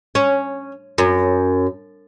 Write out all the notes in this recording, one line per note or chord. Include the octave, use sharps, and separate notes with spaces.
C#4
F#2